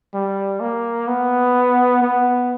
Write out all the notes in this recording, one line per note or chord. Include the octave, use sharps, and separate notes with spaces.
G3
A#3
B3
B3